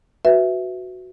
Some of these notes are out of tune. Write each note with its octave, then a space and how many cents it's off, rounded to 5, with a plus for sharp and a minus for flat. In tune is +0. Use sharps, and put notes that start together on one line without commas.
F#4 +0 B4 +0 E5 +0